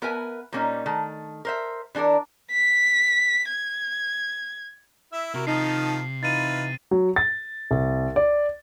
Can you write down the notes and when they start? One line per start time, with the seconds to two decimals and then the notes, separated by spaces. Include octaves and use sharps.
0.02 B3 A#4 B4 E5 G#5
0.52 A#2 G3 A#3 C#4 D#4
0.86 D#3 A3
1.45 A#4 C5 E5
1.95 E3 D4 G#4 A#4 D5
2.51 B6
3.50 G#6
5.13 E4 E5
5.34 C3 F#4 A#4
5.47 D#3 F3 D#4 A5 C7
6.23 E3 D#4 F4 B4 A6 D#7
6.91 F#3
7.16 A6
7.71 C2
8.16 D5